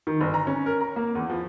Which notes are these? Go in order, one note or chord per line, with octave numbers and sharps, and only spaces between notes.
D#3
G1
A#5
C#4
A#4
A#5
A#3
E2
F3